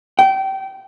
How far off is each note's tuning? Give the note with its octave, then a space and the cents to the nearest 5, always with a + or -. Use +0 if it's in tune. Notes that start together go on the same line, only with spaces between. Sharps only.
G5 -25